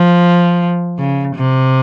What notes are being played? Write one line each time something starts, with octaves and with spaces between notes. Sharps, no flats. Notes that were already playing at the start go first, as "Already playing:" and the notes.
Already playing: F3
C#3
C3